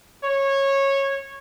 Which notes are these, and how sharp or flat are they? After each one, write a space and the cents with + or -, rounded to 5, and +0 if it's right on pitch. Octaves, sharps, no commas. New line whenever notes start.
C#5 -15